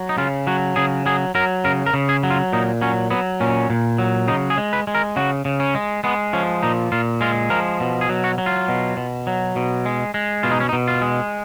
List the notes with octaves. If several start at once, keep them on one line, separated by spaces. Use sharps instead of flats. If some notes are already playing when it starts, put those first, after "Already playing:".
Already playing: F#3
D#4
C#3 F4
F#3 F#4
C#3 G#4
F#3 G#4
F#3 A#4
C#3 A#4
A#4
C#3
G#4
F#3
F4
A#2 D#4
F#3 C#4
F#3 B3
A#2 C#4
A#2
F#3
C#3 D#4
G#4
G#3
B4
G#3
A#4
C#3 F#4
C#3
C#4
G#3
G#3 B3
F3 C#4
A#2 D#4
A#2 F4
G#3 F4
F3 A#4
B2
G#4
F#3
F#4
F#3
F4
B2
B2
F#3
B2
G#3
G#3
B2 F4
D#4
C#4
D#4
B2
F4
G#3